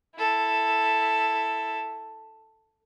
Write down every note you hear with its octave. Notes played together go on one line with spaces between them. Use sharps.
E4 A4